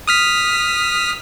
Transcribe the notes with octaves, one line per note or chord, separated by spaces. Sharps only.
D#6 F6 B6